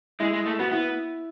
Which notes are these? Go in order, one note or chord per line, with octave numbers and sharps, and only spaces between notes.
G#3 E4
G#3
A3
B3 F#4
B3 E4